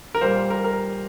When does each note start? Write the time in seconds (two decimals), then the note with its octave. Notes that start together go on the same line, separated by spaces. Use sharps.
0.15 A#4
0.21 A#2 G3 A#3 C5
0.50 A#4
0.64 A#4